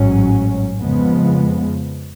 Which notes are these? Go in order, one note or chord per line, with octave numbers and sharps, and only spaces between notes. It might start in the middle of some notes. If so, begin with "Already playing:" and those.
Already playing: A1 G#2 F#3 C#4
F2 C#3 F3 G#3 B3